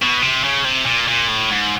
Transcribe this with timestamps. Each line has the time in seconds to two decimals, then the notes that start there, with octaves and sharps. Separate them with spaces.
0.02 B2
0.22 C3
0.45 C#3
0.65 C3
0.86 A#2
1.08 A#2
1.28 A2
1.50 G#2